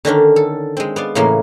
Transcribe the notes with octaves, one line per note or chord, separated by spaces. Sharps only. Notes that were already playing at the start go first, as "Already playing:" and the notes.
D3 D#3 C#4 D4
A4
G#3 C4
B3 D5 F5
A2 C#3 E3 A#3 C6